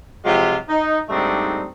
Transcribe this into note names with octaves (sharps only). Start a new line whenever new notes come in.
C3 F3 F#3 G#3 F4 G4
D#4
G#2 G3 A3 C4 D4 D#4